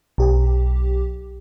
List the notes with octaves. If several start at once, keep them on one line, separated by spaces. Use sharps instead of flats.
B1 G4